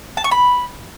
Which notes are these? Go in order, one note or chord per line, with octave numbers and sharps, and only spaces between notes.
A5
C#6
B5